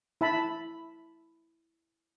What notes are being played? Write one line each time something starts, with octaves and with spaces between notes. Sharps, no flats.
E4 E5 A5 B5